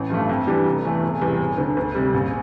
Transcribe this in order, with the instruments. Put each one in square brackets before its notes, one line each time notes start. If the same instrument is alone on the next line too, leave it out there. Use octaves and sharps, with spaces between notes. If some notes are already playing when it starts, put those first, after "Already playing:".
Already playing: [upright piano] A1
G2 F3 A3
F2
E3 G3 D4 G4
F1
E2 E3 A3
E1
E2 C3 G3
E1
D2 D3
D2
C3 G3
A#1